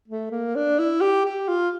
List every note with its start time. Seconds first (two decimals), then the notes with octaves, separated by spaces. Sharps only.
0.08 A3
0.31 A#3
0.55 D4
0.79 E4
1.01 G4
1.26 G4
1.48 F4